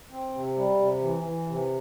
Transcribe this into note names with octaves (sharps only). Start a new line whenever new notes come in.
C4
C3
G3
C3
E3
E3
C3